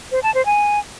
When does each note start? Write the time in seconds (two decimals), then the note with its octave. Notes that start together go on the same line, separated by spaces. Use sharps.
0.12 C5
0.23 A5
0.34 C5
0.46 G#5